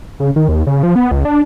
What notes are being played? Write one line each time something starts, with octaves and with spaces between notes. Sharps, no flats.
C#3
D#3
D#2
C#3
F3
B3
C#2
D4